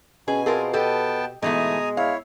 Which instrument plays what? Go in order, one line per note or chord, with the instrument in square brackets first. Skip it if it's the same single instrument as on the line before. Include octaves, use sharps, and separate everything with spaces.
[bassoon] B2 [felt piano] C#4 [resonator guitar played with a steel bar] G#4 [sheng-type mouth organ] G#5
[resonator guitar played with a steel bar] C4 F4 A#4 [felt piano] G#4 A5
[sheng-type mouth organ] B3 G5 A5 [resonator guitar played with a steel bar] G4 D#5 [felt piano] A4
[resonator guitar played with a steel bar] G#2 E3 A3 [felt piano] B2 [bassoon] G#3 [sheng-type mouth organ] G#5 A#5 D#6
[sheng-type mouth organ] E4 C#5 [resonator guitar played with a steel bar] F5